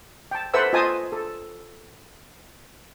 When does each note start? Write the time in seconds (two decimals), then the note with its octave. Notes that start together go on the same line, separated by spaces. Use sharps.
0.31 G5 A5
0.54 A4 B4 C5 E5 F#5 E6
0.73 F4 C5 D#5 G#5 A5 D#6
1.12 A4